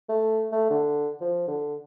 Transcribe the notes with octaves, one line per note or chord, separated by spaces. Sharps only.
A3
A3
D3
F3
D3